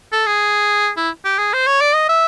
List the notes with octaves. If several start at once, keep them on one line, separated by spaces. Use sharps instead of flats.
A4
G#4
E4
G4
G#4
C5
C#5
D5
D#5
E5